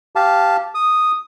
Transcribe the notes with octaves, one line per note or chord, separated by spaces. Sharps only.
G4 F5 A5
D#6